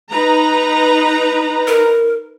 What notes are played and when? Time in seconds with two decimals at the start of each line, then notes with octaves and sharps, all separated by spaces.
0.11 D#4 B4 A#5
1.68 A#4